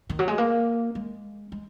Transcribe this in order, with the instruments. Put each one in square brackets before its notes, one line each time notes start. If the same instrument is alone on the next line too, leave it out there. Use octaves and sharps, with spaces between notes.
[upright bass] D#3
F#3
G#3
A#3
G#3
G#3